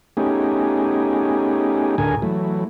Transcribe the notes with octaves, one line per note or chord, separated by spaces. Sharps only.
A3 B3 C#4 D#4 G4 G#4
D2 A2 D3 G#4 A#4 G#5
E3 F#3 A3